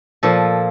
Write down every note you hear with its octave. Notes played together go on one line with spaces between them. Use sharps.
A#2 F3 A4